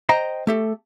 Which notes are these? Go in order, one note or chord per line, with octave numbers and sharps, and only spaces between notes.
C5 D#5 G5 A#5
A3 G4 A4